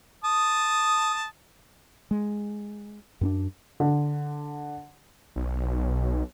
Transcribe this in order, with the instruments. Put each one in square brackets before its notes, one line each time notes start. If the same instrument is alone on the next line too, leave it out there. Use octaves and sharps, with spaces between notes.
[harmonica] A5 D#6
[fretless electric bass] G#3
F#2 C4 D4
[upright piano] D3
[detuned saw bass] B1